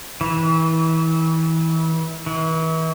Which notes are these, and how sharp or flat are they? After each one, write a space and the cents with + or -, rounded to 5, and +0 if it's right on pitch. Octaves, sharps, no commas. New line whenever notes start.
E3 -30
E3 -40